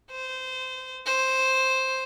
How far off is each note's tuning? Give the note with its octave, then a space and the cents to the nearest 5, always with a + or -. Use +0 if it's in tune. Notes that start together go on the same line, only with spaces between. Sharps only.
C5 -20
C5 +5